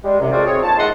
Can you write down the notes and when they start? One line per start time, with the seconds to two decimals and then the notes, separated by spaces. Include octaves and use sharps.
0.03 G3 G#3
0.19 C2 F#2 C3
0.31 G#3 A3 C4 F4 F#4 D5
0.45 C4 D#4 G#4 C#5
0.63 D#3 F3 A#3 A5
0.78 G#2 D#3 E4 D#5 F#5 C6